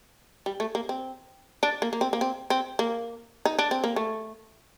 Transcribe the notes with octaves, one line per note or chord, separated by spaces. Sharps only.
G3
A3
A#3
C4
D4
A#3
A#3
C4
A#3
C4
C4
A#3
D#4
D4
C4
A#3
A3